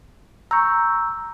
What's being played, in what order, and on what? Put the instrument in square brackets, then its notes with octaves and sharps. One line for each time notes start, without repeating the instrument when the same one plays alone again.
[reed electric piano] A#5 C#6 [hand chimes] E6 G6